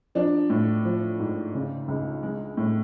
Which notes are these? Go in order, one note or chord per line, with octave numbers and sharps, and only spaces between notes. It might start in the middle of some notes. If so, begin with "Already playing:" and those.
F3 D4
A2
F3
G#2
C#3
C#2
G#3
A2